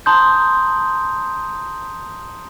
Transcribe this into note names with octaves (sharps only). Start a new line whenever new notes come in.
A5 A#5 C6 D#6 G6